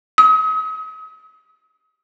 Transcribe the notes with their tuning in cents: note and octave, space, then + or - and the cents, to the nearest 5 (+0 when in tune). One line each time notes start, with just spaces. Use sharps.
D#6 +40